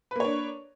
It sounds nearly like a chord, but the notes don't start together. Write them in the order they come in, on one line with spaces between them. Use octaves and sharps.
B4 A#3 C#5 D4